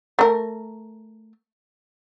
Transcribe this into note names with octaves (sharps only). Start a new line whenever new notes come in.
A3 A#4